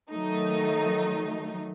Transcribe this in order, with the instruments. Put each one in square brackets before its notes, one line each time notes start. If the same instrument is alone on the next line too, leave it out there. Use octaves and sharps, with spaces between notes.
[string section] D#3 F#3 A3 D#4